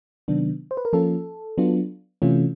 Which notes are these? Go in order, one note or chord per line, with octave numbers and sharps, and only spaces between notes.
C3 D#3 F#3 B3 D4
C5
B4
A#4
F3 A#3 C#4 F4 A4
F#3 B3 D4 F4
C3 E3 A3 C#4 F4